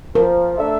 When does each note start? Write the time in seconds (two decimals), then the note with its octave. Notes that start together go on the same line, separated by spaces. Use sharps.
0.15 F3 A#4
0.58 A3 D4 A4 E5